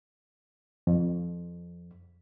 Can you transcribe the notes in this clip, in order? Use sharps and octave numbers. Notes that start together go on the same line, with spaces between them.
F2